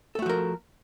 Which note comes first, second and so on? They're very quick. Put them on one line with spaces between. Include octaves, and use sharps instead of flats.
A4 A3 F#4 F3 A#4